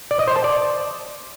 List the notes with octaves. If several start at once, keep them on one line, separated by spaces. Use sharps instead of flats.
D5
D#5
C5
A5
D5